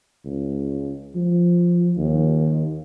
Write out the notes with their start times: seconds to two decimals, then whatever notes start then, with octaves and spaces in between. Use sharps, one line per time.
0.25 C#2
1.15 F3
1.97 D#2